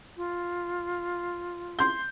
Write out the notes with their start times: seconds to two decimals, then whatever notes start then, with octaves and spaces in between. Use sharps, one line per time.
0.17 F4
1.79 C6 G6